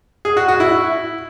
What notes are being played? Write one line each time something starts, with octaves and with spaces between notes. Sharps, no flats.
G#4
F#4
F#4
E4